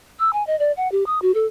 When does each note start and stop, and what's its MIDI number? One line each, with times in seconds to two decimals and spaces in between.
0.19 0.31 88
0.33 0.45 80
0.47 0.57 75
0.59 0.72 74
0.77 0.90 78
0.92 1.04 67
1.06 1.19 87
1.22 1.32 66
1.34 1.46 69